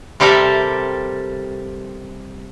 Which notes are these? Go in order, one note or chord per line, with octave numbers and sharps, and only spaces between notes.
C3 G3 G4 A4 A#4 E5